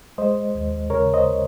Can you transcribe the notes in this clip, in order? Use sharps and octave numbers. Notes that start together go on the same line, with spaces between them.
G#3 C5 D#5
D#2
C#3 A#4 C#5
C5 D#5